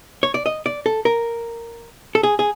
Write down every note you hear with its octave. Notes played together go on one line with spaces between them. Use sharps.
C#5
D5
D#5
D5
A4
A#4
A4
G#4
G#4